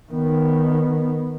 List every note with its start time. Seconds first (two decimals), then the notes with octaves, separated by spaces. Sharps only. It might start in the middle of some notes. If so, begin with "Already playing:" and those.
0.12 D#3 B3